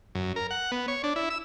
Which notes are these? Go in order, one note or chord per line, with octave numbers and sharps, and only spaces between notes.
F#2
A#4
F#5
B3
C#5
D4
E4
E6